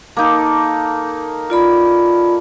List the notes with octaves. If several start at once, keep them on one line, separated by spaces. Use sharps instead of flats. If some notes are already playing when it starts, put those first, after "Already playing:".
A#3 D#4 A4
F4 D5 B5